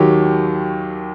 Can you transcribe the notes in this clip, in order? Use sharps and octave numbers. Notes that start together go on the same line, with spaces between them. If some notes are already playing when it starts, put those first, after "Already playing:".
Already playing: D#2 D#3 F#3 G4